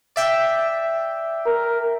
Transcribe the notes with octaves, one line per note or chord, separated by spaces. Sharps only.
D5 E5 G5
A#4